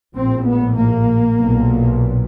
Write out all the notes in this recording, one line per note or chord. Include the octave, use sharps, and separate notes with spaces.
A#1 A2 C4
B3
A#3
B1 A#2